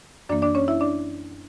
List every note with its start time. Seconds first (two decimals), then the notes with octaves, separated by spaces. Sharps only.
0.29 F#2 E3 A#3 D4 D5
0.42 D4 D5
0.55 C#4 C#5
0.68 E4 E5
0.81 D4 D5